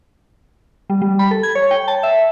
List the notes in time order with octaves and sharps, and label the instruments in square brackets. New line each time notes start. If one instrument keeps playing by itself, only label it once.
[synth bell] G3
G3
B5
A4
G#6
C#5
G5
A5
E5